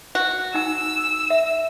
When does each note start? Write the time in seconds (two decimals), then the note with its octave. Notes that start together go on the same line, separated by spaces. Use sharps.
0.15 F#4
0.54 D#4 G#5 E6
1.30 E5